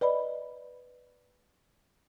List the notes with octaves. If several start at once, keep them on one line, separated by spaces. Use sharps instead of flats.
B4 D5 D#5 B5